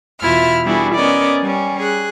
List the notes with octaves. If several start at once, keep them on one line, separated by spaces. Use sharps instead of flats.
E2 B2 E4 F4 E5 F6
G3 B3 D4 E4 F#4 G#4
B3 C#4 A#4 D5 D#5
G3 C#4
G#4 F#6